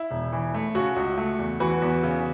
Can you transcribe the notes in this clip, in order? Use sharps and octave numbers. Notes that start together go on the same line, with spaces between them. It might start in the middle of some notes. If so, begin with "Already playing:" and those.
Already playing: E4
E1
E3
A3
C#3 F#4
C#2
A3
E2
E3 F#4 B4
E2
C#3